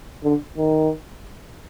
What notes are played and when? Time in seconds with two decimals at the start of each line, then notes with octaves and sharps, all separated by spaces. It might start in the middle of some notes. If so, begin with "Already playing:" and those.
0.24 D3
0.58 D#3